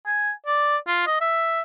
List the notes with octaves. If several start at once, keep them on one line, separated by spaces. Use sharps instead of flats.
G#5
D5
F4
D#5
E5